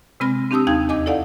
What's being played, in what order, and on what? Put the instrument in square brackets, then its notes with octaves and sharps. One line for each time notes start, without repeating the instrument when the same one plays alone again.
[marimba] C3 G#3 C4 B5 F6 A#6
C4 D4 G4 A5 D#6 E6
D#2 D#4 F5 A5 G6 G#6
E2 D#5 G#5 D6 G6
E4 A4 D5 F5 F#5 G#5